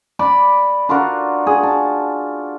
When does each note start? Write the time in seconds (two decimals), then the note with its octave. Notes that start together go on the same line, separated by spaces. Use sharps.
0.19 D5 B5 D6
0.89 D4 F4 F#4 A#4
1.47 G#4
1.63 A5